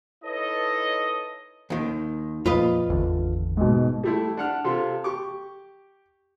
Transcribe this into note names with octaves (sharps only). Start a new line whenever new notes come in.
D#4 E4 A4 B4 C#5 D#5
D#2 D#3
F2 A#2 F4 B4 D#5
G#1 E2 D3
G#2 B2
G3 A3 E4
D4 F#5 F6
C3 F4 A4
G4 C#6 D6